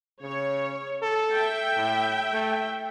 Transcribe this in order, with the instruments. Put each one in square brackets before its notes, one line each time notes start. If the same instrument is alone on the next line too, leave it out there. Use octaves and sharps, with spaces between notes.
[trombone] C#3 [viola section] C#5
[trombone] A4
[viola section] E5 G5
[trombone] A2
A3